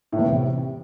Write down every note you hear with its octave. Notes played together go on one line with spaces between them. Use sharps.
A2
E2
C3